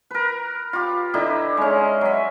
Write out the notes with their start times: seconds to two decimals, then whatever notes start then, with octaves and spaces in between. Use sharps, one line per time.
0.10 A#4 B4
0.73 F4 G4
1.14 D3 D#4 E4 G4
1.57 G#3 C#4
2.01 F#3 E5